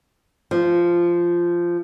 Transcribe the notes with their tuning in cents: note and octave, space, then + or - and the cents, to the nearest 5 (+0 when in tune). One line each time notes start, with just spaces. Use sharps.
F3 -10